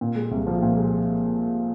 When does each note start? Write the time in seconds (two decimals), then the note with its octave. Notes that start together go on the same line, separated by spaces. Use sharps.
0.01 A#2
0.15 G#3
0.31 C2
0.47 F3
0.62 A#2
0.77 G#3